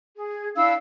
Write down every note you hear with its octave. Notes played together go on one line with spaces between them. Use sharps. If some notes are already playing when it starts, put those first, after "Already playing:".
G#4
D4 E4 F5 E6